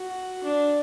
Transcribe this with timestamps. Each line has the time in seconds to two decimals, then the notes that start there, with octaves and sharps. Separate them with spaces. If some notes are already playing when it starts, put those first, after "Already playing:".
Already playing: F#4
0.44 D4